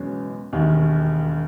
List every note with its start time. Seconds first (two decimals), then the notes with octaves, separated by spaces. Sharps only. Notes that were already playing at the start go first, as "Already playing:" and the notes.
Already playing: F#1 E2 B2 G#3 C#4
0.53 E1 D#2 D#3